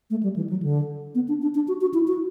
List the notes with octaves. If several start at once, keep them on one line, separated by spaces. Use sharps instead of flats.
A3
G3
E3
F#3
D3
B3
D4
D4
D4
F#4
F#4
E4
F#4